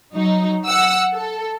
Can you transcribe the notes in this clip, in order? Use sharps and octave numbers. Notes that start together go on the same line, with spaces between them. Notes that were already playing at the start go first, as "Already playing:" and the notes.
F#3 D#4
F#5 E6
A4